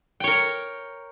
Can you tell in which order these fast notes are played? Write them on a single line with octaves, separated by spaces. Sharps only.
G5 C#5 A#4